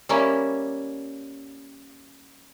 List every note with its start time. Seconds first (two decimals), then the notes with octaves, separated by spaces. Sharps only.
0.09 G3 A#3 C#4 E4